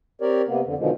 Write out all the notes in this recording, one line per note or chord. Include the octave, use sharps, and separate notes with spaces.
C4 G4 A#4 C#5 D5
C3 A#3 B3
F2 D3
B2 D3 D#3 F3 G#3